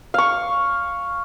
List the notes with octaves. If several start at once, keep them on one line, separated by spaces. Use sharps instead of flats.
F5 C#6